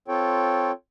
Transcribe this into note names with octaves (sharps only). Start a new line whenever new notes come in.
C4 F4 A4 C#5 G5